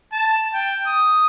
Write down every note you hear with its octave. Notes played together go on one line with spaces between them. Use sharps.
A5
G5
D#6